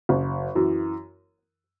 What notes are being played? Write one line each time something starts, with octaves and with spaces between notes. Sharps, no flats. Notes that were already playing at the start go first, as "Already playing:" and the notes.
F#1
F#2 E3